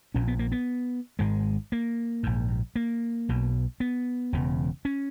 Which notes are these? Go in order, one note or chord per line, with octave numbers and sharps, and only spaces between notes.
A#1 A#2 C#4
B3
A#3
B3
G#1 G#2 G#3
A#3
A#1 G#2
A#3
B1 B2
B3
E1 E2 C#3
C#4